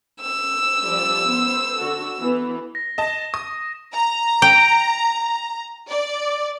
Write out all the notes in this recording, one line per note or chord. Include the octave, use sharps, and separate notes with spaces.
E6
F3 G3 D5
B3 C5
D3 F#4 A4
E3 B3
A#6
D#5 A5 A#6 E7
D#6
A#5
G5
D5